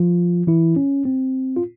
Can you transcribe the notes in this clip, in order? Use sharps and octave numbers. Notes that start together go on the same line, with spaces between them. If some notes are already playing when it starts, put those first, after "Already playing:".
Already playing: F3 F4
E3 E4
C#4
C4
F4